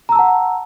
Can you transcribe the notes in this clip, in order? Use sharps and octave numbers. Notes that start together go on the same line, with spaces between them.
F#5 A5 A#5 E6